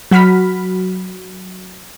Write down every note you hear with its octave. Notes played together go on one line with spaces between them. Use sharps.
F#3 F#4 B5 F6 B6